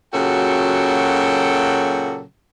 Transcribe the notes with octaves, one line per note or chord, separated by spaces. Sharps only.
A#2 C#3 F#3 F#4 A4 G5